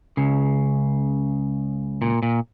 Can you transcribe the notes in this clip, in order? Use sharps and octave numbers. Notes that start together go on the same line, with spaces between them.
C#2 C#3
A#2
A#2